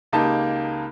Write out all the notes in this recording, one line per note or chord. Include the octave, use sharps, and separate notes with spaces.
C#2 A#3 D#4 G4 A5